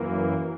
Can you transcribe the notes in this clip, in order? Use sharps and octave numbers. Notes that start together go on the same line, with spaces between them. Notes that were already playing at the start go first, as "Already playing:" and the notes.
Already playing: F#2 E3 A#3